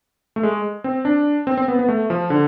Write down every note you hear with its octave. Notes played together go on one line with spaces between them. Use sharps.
A3
G#3
C4
D4
C4
C4
B3
B3
A3
F3
D3